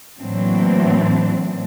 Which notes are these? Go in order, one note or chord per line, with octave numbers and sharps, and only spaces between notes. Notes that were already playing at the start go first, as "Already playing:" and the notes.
A2 E3 F#3 A#3 C4 D4